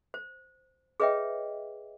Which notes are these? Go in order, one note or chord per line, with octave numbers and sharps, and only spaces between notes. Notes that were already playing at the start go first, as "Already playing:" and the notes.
C5
G#4 B4 C#5 D#5 E5 G5